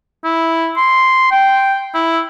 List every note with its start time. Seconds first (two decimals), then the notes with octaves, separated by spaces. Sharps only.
0.24 E4
0.76 C6
1.31 G5
1.94 E4